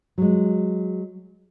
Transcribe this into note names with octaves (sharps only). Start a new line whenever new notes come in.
F#3 G#3